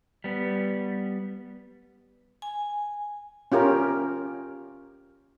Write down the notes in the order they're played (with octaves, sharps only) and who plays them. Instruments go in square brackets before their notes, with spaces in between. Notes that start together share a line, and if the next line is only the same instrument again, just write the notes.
[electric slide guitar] G3 B3
[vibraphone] G#5
[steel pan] C#4 F4 G4 A#4